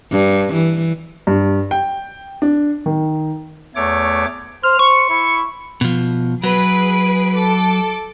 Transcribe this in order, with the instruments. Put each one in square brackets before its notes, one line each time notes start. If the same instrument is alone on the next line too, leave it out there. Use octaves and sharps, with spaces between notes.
[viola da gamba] G2
E3
[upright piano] G2
G5
D4
D#3
[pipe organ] E2 A3 C#5 D6
[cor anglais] C5 [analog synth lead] F6
[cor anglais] C5 [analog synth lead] C#6
[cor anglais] E4
[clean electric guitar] B2 F3
[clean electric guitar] F#3 [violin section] G#4 B4 D7
[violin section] A4 D6